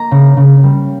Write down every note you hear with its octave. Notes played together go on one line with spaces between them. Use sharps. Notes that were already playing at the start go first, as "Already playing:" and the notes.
Already playing: A#3 D#5 A#5
C#3
C#3
G3